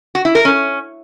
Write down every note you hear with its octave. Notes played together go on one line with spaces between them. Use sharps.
F#4
E4
A#4
C#4